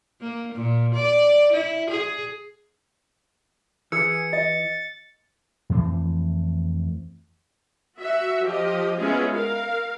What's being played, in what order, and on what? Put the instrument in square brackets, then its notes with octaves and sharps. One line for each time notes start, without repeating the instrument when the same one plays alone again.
[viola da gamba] A#3
A#2
D5
E4
G#4
[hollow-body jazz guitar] E3 [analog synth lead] G#4 [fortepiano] E6 [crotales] C#7
[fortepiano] D#5 [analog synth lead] A6
[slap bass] F2 E3 A3 C4
[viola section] F#4 E5
F3 G4 D#5
G#3 B3 C#4 E4 F4 G#4
A#4 F5